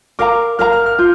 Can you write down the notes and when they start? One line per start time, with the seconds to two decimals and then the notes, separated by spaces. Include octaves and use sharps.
0.19 A#4 F5 A#5 D6
0.59 A#4 F5 A#5 F6
0.72 F6
0.86 F6
0.99 F4 G6